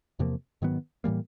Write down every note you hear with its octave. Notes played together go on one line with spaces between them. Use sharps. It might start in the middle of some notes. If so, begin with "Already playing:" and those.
E2 C3 F3 A#3
G#2 D#3 F#3 B3
A2 E3 G3 A#3